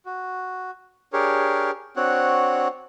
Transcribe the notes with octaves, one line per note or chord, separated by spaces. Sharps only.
F#4
D4 G4 G#4 A#4 C#5
C4 D4 F#4 C#5 F#5